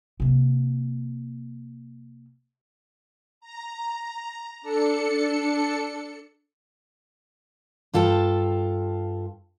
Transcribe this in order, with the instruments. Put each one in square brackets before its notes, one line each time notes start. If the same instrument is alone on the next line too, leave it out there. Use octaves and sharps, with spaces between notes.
[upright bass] C3 A#3
[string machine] A#5
D4 A4 C#7
[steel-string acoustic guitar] G2 F4 A4 G5 A5